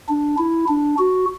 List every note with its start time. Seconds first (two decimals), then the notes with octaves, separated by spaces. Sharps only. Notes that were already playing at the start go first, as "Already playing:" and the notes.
0.08 D4
0.38 E4
0.68 D4
0.98 F#4